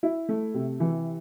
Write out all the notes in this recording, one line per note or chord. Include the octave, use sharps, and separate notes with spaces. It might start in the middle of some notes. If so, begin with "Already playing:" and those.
E4
A3
C3
E3